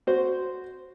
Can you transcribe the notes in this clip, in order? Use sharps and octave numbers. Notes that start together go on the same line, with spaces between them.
F#4 C5